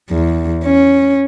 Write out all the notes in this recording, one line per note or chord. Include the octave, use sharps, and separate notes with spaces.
E2
C#4